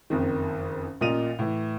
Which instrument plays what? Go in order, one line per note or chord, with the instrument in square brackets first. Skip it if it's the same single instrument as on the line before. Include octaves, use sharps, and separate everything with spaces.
[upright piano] F#1 F2 D#3
A1 A#2 F4 D#5 D#7 F7
A2 E3